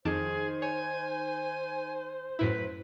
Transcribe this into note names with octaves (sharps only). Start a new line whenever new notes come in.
F2 D#3 G#4 C5 A5 D6
C#5 G#5
F#2 A2 E4 B4